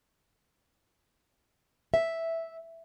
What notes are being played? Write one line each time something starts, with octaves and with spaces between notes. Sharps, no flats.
E5